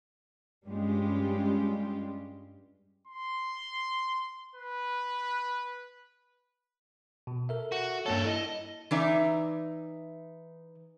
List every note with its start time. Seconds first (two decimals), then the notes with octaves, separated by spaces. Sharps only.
0.68 G2 G3 G#3 C#4 F4 G4
3.07 C6
4.55 B4
7.27 B2
7.49 A4 A#4 E5
7.72 F#4
8.06 G2 A#3 A4 A#4 C#5
8.26 E4 D#5
8.91 E3 D#4 D5 E5